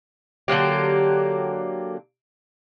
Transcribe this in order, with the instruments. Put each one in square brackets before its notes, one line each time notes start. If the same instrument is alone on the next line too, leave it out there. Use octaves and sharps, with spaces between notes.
[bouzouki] D3 F#3 A#3 G4